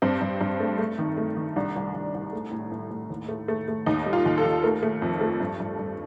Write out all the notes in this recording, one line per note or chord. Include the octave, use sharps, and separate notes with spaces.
G2 C4
G2
G2
A3
A3
D#3
A3
D#3
C2 D4
C2
C2
C2
A3
A2
A2
A2
D#2
A3
A3
A3
D#2 D#4
G3
F4
D#2
A4
D#2
A3 A#4
A3
F2
A3
G2
G2
G2